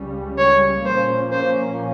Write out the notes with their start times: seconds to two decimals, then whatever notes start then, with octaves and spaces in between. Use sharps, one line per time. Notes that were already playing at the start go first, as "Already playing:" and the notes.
Already playing: C#2 C#3 G3 C#4
0.38 C#5
0.85 A#2 F3 A#3 C#4 C5
1.32 C5